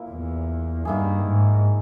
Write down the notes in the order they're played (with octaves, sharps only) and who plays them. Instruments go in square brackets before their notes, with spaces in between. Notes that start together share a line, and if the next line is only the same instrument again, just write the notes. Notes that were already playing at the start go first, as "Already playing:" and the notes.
Already playing: [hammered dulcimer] A#2 A#3 E4
[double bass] E2
[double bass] G2 [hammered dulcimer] D#3 A#3 E4 G#4
[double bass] G#2